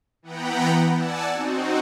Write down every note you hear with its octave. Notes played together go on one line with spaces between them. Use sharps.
E3 B3 F#5 G5 A#5 B5
D5 F#5 G#5 A5 E6
C4 D#4 F#4